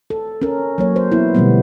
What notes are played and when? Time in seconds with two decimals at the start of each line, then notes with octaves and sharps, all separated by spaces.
0.10 A4
0.42 C#4 A#4
0.78 F#3 A#3 C#5
0.96 C5
1.12 B3 E4
1.35 B2 D3 F3 G3 A3 B3